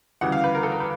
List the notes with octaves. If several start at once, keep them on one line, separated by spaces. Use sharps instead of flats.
D2 C#3 E3 G3 F#5
F5
B4
A#4
A4
A#4
B4